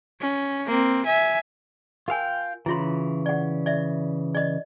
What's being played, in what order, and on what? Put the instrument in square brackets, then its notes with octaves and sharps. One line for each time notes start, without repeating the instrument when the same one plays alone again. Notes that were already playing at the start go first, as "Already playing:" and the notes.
[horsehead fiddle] C#4
A#3 C4
E5 G#5
[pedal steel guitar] F4 F5 G5 [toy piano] A#4 G#5
[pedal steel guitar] C#3 E3 [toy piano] E4 F4 C6
[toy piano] D5 F#5
D5 E5
D5 D#5